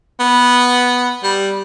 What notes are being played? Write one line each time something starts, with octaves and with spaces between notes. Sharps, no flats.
B3
G3